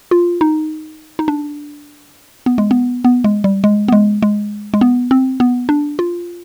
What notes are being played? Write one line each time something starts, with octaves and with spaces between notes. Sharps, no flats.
F4
D#4
D#4
D4
B3
G#3
B3
B3
G#3
G3
G#3
B3
G#3
G#3
G#3
B3
C4
B3
D4
F4